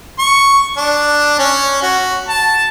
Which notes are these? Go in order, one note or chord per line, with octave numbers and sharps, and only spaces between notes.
C#6
D4
C#4
F#4
A5